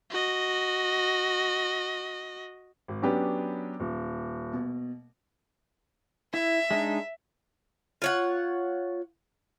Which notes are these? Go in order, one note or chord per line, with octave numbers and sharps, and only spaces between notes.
F#4 D#5
G#1
F#3 B3 C#4 D4 G4 B4
D#1
B2
E4 E5
G#3 D4 D#4
F4 C#5 F#5